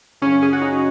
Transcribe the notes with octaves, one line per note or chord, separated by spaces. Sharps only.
F#2 C#3 C#4
G#4
F#4
D#4